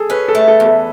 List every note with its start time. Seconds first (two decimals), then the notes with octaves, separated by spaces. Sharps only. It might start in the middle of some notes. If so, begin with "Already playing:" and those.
Already playing: G#4 A4
0.10 C#4 B4
0.28 A4
0.35 A3
0.48 A4
0.60 E2
0.66 A4